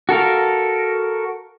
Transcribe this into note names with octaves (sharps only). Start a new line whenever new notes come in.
F#4 A4 A#4 F5